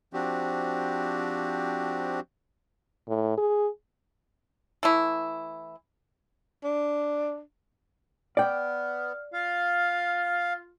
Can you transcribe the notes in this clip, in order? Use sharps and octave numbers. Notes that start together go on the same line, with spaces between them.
F3 C4 D4 F#4 G4
A2
G#4
E3 A3 E4
D4
B3 D5 F5 G5
F4 F5